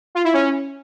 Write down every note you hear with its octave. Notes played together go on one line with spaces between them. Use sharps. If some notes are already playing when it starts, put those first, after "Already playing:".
F4
E4
C#4